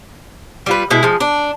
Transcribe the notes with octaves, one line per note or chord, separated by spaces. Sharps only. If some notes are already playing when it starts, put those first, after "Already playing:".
G3 F4 B4
B2 G#3 E4
F3 G#3
D4